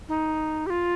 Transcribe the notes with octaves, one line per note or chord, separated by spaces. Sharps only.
D#4
G4
F4